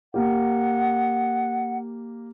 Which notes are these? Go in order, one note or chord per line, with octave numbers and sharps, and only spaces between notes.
A#3 G4 F#5